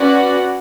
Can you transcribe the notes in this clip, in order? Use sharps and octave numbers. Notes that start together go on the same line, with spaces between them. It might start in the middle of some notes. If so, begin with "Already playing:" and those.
Already playing: C#4 F#4 B4 D5